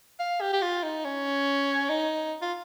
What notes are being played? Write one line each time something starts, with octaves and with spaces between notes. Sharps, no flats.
F5
G4
G4
F4
D#4
C#4
D#4
F4